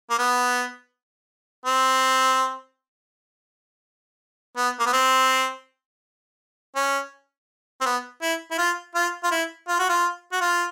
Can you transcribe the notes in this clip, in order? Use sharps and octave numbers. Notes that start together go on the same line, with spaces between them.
A#3
B3
C4
B3
A#3
B3
C4
C#4
C4
B3
E4
E4
F4
F4
F4
E4
F4
F#4
F4
F#4
F4